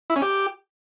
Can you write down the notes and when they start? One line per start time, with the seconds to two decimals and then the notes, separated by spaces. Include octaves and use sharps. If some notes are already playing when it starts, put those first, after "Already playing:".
0.10 E4
0.16 C#4
0.22 G4